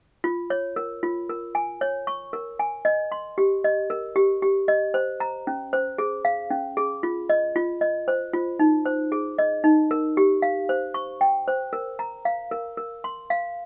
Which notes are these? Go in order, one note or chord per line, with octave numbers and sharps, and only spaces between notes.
F4
C#5
A#4
F4
A#4
G#5
C#5
C#6
A#4
G#5
D#5
C6
G4
D#5
A#4
G4
G4
D#5
C5
A#5
C#4
C5
G#4
F5
C#4
G#4
F4
D#5
F4
D#5
C5
F4
D#4
C5
G#4
D#5
D#4
A#4
G4
F5
C5
C#6
G5
C5
A#4
A#5
F5
A#4
A#4
C6
F5